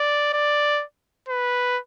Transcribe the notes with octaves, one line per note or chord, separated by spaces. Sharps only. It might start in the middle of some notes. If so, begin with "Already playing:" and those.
Already playing: D5
D5
B4